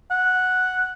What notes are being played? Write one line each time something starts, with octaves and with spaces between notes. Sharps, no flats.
F#5